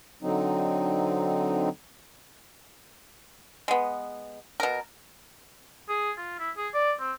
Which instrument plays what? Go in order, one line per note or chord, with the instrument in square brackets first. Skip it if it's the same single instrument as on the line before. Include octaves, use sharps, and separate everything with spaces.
[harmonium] D3 F#3 C4 D#4
[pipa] G#3 B3
B2 A#4
[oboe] G#4
F4
E4
G#4
D5
C4